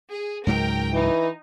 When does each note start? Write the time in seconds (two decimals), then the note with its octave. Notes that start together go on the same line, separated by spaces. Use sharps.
0.12 G#4
0.47 C#2 G#2 F#3 A#4 G5
0.94 E3 D#4